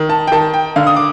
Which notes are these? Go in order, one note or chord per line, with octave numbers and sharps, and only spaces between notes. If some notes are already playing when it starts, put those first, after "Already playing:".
Already playing: D#3
A5
G5
D#3 A5
G5
D3 F5
D#6
D6